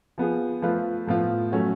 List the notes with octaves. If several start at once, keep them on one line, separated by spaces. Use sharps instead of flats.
F3 B3 F4 G#4
F3 A3 F4 B4
A2 F3 B3 F4
F#3 A3 C#4 F#4